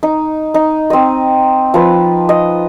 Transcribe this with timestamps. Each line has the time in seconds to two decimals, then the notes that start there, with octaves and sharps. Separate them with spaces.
0.03 D#4
0.54 D#4
0.90 C4 D#5
1.74 F3 B4
2.29 D#5